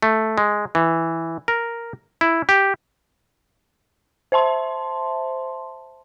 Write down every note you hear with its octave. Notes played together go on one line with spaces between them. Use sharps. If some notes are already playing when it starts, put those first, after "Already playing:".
A3
G#3
E3
A#4
E4
G4
C5 E5 A5 C6